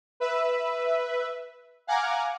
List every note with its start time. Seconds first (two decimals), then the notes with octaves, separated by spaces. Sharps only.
0.20 B4 E5
1.87 F5 F#5 G#5 A#5 D6